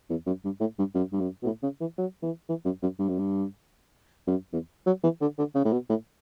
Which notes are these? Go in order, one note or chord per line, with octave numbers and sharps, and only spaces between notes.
E2
F#2
G2
A2
G2
F#2
G2
F#2
B2
A2
C#3
E3
F#3
E3
E3
F#2
F#2
G2
F#2
G2
F#2
E2
F#3
E3
D3
D3
C#3
A2
B2
A2